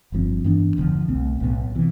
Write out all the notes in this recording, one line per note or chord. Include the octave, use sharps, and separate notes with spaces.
G1 G2 F3 C4
G2 E3 B3 D4
E1 D2 D3 F3
C2 B2 A3 C4
B1 A2 F3 B3
C3 E3